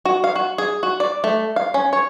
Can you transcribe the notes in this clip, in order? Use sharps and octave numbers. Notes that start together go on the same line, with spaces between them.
F#4
F5
F#4
G#4
F#4
D5
A3
F5
C#4
C#5